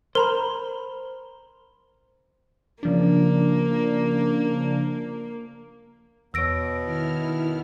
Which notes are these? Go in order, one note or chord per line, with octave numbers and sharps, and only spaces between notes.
A#4 C5 A#5 B5
C#3 F3 A#3 D4
E2 B2 B3 C#5 E6 A#6 D7
D#3 E4 F6